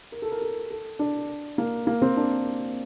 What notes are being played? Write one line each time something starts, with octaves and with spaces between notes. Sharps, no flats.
A#4
A4
A#4
A4
A4
D4
A#3
A#3
C4
D4